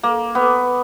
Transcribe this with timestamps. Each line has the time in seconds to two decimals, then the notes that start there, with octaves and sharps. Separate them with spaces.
0.03 A#3
0.35 B3